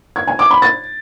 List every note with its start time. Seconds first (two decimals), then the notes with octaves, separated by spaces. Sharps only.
0.16 G#6
0.27 G#5
0.39 D6
0.51 B5
0.62 A6